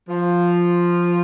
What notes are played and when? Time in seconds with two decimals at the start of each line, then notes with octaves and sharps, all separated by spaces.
0.08 F3